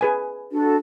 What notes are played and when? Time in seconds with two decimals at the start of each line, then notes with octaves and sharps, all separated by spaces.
0.01 G#4 B4 G#5
0.52 D4 F#4 A4